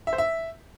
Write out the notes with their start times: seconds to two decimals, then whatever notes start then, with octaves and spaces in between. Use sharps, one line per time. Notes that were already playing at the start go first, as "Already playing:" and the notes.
0.07 E5
0.13 C5
0.18 E5